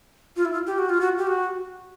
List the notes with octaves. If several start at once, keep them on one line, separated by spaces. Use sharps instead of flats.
F4
E4
F4
G4
F#4
F4
F#4
G4
F#4